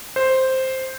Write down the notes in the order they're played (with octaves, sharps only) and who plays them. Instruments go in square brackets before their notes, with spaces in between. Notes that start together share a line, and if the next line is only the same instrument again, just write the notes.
[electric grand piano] C5